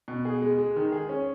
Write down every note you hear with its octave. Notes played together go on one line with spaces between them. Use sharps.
B2
G#4
G#3
G#3
D#3
G#4
C#4